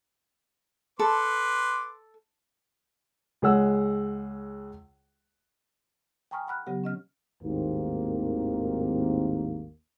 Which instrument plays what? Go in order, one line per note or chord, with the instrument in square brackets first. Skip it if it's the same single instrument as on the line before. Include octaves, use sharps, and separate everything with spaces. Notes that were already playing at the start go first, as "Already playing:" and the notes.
[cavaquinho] A4 [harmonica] B4 C6 D6
[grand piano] C#2 G#3 G#4 C#5 F#5 E6
[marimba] G5 G#5 A#5 C#6 D#6 F6
F#5 B5 F6 F#6
C#3 F#3 B3 G4 F#5
C#4 D#5 F6
[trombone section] G#1 D#2 A2 A#3 C4 A#4